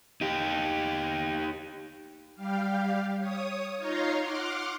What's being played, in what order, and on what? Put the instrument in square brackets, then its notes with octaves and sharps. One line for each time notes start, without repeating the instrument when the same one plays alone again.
[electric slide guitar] D#4 G4
[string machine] G3 G4 F5
C#5 D#6
D#4 F4 C#5 F5 A#5 C6
F#5 C6 D6 F6